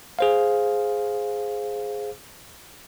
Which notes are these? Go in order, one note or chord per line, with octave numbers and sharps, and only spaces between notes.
G#4 C5 F5